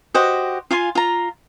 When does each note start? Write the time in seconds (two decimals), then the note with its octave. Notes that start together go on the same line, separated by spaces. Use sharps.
0.14 F#4 G4 C5 D#5
0.71 F4 F5 G#5 C6
0.95 F4 A#5